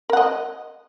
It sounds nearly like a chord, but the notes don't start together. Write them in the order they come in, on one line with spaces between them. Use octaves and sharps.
A#4 F#5 D#5